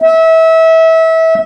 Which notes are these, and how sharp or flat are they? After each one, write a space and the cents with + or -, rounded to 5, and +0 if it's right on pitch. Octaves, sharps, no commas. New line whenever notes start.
E5 -25